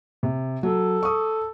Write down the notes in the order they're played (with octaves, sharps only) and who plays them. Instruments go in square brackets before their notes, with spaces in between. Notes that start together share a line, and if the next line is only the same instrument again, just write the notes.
[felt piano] C3
[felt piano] F#3 [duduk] A4
[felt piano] C#6 D#6